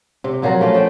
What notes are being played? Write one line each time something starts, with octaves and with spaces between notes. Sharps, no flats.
C3
A#2 F3 F#3 A#4
A3 A#3 C#4 F4
F3 G5